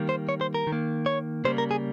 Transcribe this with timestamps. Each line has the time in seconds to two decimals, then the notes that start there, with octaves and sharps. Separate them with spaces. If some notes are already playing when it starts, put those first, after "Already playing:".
Already playing: D#3 G3 A#3
0.09 C5
0.29 C#5
0.41 C5
0.54 A#4
0.67 D#3
0.72 A#3
1.06 C#5
1.45 C#3 G3 A#3 C5
1.58 A#4
1.71 G#4